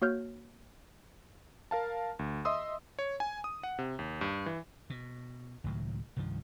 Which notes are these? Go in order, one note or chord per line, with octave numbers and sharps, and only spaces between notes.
A#3 F#4 C#5 F6 G6
A#4 F5 A5
D2
D#5 E5 C6 D#6 E6
C#5
G#5
D#6
F#5
C3
D#2
G2
E3
B2
C#2 A2 D#3 F#3
C2 G2 D#3 F3